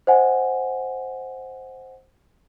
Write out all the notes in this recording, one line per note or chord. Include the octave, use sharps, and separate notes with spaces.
C5 D#5 F#5 G#5